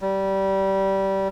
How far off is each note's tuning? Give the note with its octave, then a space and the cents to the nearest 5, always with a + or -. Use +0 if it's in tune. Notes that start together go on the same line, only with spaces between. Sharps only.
G3 -20